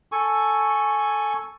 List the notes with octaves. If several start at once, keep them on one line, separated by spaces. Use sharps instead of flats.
A4 G#5 C#6